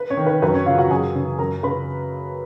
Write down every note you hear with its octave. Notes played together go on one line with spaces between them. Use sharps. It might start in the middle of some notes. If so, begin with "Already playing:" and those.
Already playing: B4
C#4 C#5
D#3
B4
F#2 B4
C#4 C#5
C#3 F4 F5
F#4 F#5
F#2 G#4 G#5
C#3
F#2 A#4 A#5
C#3 B4 B5